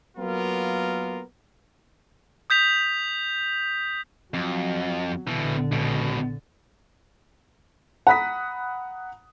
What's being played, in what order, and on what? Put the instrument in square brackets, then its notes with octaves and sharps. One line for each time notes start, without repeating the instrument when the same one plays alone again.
[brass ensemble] F#3 A#3 B3 F4 A#4
[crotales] D#6 G6 B6 F7
[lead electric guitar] F2 [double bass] F#3
[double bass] A#1 D3 [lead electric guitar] B2 E3
[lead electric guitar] C#2 B2
[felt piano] F#5 A#5 B5 D#6 B6